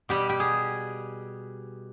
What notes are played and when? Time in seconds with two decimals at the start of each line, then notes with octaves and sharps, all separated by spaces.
0.09 B2 G3 G4
0.29 G4
0.40 G#4